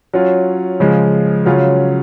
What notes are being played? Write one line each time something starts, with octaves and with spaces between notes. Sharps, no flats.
F#3 C#4 F4
C#3 F3 G#3
C#3 F#3 C#4 F4